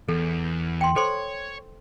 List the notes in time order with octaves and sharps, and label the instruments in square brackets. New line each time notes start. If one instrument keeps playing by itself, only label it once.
[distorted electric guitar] E2 [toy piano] A4
[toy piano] G5 C6
[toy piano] A4 C5 C6 [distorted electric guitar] C#5